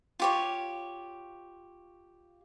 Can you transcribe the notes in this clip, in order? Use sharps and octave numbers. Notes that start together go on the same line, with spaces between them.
F4 G4 C#5